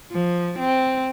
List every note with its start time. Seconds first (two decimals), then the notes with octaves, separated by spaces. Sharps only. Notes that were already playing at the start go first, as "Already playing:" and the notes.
0.12 F3
0.58 C4